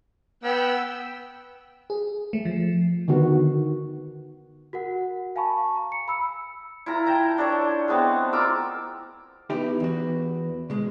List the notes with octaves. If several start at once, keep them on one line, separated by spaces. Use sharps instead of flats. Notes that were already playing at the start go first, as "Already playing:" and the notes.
B3 G5 E6
G#4
A3
F3
D3 D#3 B3 F#4
F#4 A#4 F#5
F5 G#5 A5 B5 C#6
A#5
C#7
B5 E6 C#7
E4 F4 A#5
G5 A5 A#5
D4 A4 C#5
G#3 A3 B3 C4
F4 A#4 D6 E6
B3 D#4 E4 G4 B4
E2 F#4
B2 G#3